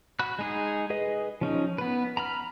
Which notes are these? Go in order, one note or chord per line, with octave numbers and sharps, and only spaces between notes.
F#4 B5 F#6
G#3 D#4 G#4
G#4 B4 D#5
F3 C#4 D#4
B3 B4
A#5 B5 F6